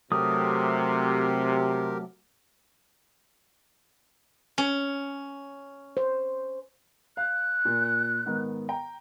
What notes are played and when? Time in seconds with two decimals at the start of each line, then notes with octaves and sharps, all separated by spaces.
0.12 C3 F#3 A3 G4 A#4 D#6
4.58 C#4
5.97 C5
7.17 F5 F#6
7.65 A#2
8.26 G#2 D#3 B3
8.69 G5 A#5